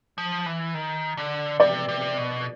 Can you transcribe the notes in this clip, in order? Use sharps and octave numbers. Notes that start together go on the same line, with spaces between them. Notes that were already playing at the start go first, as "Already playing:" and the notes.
F3
E3
D#3
D3
C3 D5
C3
B2